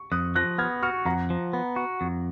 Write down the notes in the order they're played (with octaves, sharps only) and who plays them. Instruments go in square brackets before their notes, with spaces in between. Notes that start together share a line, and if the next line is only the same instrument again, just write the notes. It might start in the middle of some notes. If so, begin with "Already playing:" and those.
Already playing: [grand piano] C#6
[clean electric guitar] F2 [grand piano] D#6 F#6
[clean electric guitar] F3 [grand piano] F#6 A#6
[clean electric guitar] B3 [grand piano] F6 G#6
[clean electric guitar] F#4 [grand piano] C#6 F6
[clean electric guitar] F2 [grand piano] F#5 A#5
[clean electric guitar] F3
B3
F#4
F2